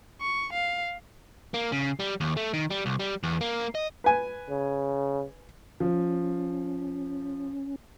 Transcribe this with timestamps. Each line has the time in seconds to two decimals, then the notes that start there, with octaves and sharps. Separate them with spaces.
0.21 C#6
0.53 F5
1.54 A#3
1.72 C#3
2.00 G3
2.21 D#2
2.37 A3
2.53 D#3
2.70 G3
2.86 C2
2.99 G3
3.23 E2
3.41 A#3
3.75 D#5
4.04 B4 G#5
4.50 C#3
5.80 F3 C#4